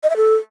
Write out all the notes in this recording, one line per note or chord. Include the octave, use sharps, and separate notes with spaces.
D#5
E5
A4